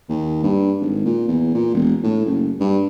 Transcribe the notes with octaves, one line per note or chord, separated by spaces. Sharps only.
D#2
G2
G#1
A#2
E2
A#2
E1
A2
F#1
G2